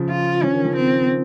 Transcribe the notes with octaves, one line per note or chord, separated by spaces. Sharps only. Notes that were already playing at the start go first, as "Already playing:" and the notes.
Already playing: C#3 F3
F4
F3 C#4
D#3
C#3 F3
C4